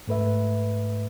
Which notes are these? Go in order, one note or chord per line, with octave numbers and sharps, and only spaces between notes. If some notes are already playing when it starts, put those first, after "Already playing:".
G#2 A3 B4 E5